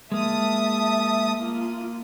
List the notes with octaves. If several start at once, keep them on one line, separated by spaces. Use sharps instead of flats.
G#3 A#3 E5 A5 D#6
A#3 F4